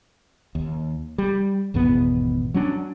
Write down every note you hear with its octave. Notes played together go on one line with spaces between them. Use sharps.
D#2
G3
G#1 E2 B2 B3
F#3 C#4 D4